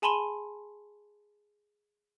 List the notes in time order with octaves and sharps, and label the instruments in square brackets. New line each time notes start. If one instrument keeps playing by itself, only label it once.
[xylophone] G#4 G#5 A5 B5 C6 D#7